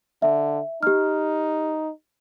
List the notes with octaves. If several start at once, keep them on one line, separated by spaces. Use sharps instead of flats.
D3 E5
D#4 G4 F6